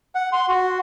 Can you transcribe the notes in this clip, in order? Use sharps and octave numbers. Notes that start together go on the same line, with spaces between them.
F#5
C6
F#4